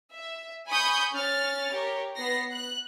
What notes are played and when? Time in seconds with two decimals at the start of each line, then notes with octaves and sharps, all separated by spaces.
0.13 E5
0.68 G#5 B5 C#6 D#6 G6
1.14 C#4 F6 A6
1.72 G4 A#4 C#5
2.16 B3 A#6 C7
2.53 F#6